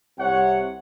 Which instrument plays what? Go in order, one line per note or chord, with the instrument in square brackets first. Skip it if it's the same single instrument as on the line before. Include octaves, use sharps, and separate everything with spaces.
[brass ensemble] C2 C3 C#5 F#5